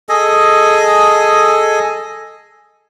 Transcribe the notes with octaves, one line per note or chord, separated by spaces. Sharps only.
G#4 A4 D#5 G#5